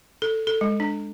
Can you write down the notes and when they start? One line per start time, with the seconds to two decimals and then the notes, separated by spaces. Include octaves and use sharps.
0.22 A4
0.47 A4
0.61 G#3
0.80 D4